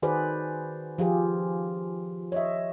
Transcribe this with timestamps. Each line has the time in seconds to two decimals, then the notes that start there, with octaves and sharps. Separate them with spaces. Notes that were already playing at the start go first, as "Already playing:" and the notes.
0.02 D#3 F#4 G#4 B4 C5 D5
0.98 F3 F4 G4 G#4
2.32 C#5 D#5 E5